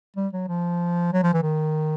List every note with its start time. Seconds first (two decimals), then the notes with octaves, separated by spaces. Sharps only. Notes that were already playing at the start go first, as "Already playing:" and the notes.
0.17 G3
0.33 F#3
0.48 F3
1.13 F#3
1.23 F3
1.33 E3
1.43 D#3